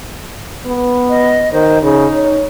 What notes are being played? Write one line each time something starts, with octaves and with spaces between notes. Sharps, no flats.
B3
D#5
D#3 C5
C#3 D#4
C#5